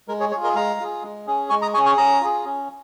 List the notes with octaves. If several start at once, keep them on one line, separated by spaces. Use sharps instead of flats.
G#3 A#4
G#4 C#5
F4 G#4 C#5
A#4 D#5
G#3 F5 A#5
F4 G#4
G#3
C#4 G#4
G#3 G#5 C#6
A#5 D#6
C#4 G#4 G#5 C#6
G#5 C#6
C#4 A#5 D#6
F4 G#4
C#4